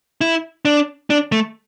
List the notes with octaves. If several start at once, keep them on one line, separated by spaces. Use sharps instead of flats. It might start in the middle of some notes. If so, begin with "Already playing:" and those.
E4
D4
D4
A3